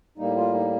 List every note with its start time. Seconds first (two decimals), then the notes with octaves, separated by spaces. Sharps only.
0.18 A2 G3 A#3 D#4
0.37 F4
0.54 D#4